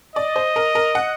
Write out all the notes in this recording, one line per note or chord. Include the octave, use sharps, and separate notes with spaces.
D5 D#5
C5
A#4
A#4
F#5